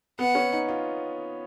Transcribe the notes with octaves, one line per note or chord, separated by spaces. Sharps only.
B3 F#5
C#4
D#4
F4